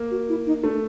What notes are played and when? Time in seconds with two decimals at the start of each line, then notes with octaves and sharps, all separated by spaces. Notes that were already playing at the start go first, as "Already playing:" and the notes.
Already playing: A#3
0.11 F#4
0.29 E4
0.46 D#4
0.63 A3 D4